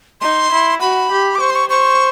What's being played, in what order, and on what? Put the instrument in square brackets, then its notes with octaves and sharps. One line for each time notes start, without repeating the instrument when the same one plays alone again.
[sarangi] D#4 [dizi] C6
[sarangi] E4
[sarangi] F#4 [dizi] B5
[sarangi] G4
[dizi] D6
[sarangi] C5 [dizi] C#6
[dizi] C6
C#6
[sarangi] C5 [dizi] C#6